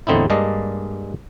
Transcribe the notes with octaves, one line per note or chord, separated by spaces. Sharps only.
E2 A2 D3 C4 D#4 E4
G2 G#3 A#3 D5 D#5 A5